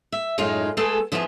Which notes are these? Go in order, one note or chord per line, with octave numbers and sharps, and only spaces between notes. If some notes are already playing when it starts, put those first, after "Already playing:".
E5
F#2 A2 G#3 D#4 F4
G#3 A3 B3 G#4 A4
F2 F3 B3 E4 F4 G#4